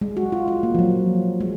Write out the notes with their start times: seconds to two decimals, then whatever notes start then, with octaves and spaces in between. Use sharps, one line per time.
0.01 G#3
0.17 F#4
0.32 F4
0.48 F4
0.63 A#3
0.75 F3
0.79 F#3
1.41 G#3